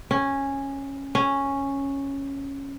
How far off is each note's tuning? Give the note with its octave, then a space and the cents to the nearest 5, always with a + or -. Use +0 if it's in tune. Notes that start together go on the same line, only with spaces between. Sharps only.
C#4 -10
C#4 -5